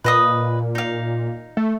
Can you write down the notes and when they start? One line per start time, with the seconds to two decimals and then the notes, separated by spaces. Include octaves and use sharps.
0.04 A#2 B4 D#5 D#6
0.75 D#4 F5
1.57 A3